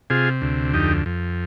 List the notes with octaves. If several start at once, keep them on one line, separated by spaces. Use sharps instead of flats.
C3 F4 G#4
D2
F2 D#4 G4
F2